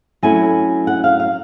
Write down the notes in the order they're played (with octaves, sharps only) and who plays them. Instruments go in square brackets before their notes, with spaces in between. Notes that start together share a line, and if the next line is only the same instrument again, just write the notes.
[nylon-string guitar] F#3 A3 C#4 E4 G#5
F#5
F5
F5